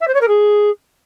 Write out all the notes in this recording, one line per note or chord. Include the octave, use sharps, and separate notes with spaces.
E5
C5
C#5
A#4
G#4